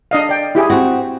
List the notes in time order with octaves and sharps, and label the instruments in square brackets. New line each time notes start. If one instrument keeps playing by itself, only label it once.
[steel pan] D4 D#5 F5
D5 G5
E4 G4 G#4
[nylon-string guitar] C4 F#4